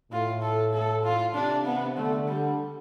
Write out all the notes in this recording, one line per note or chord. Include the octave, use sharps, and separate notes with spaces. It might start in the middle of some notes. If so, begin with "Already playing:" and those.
A2 F4
A4
A4
F4
C3 D4
B3
D3 A3
G3